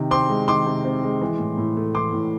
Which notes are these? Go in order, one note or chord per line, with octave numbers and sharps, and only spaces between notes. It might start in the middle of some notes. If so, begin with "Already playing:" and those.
Already playing: C3 D#3
C4 C6 D6
G#3
D#3 C6 D6
C3
C4
G#3
E3
A2
A2
A3
E3 C6 D6
A2